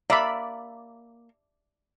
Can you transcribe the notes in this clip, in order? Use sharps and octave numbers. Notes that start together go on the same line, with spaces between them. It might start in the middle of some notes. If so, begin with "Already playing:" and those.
A#3 D5 E5 B5